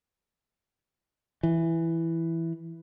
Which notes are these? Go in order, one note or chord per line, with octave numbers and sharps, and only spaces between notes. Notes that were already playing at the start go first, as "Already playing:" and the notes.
E3